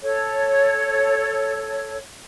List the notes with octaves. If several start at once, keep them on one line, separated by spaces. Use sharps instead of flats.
A4 C#5